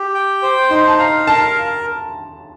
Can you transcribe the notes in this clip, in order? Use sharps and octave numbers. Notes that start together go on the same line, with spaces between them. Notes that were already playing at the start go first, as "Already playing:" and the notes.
Already playing: G4
G5
C5
D#4 C6
A5
F5 A#5
A#4 A5